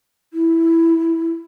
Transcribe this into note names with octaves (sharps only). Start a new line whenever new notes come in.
E4